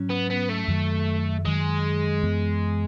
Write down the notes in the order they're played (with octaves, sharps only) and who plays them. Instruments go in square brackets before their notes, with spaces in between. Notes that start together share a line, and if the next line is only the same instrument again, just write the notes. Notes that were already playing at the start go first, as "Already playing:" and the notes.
Already playing: [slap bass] G#2 F#3 C#4
[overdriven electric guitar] B3
B3
A3
[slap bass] F#2 D#3 F#3
[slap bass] F#2 D#3 F#3 [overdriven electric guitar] G#3
[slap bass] F#2 E3 B3